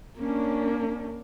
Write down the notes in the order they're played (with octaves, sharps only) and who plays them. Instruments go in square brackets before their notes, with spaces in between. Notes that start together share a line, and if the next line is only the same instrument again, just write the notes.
[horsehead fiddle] A#3 [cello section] C#4 D4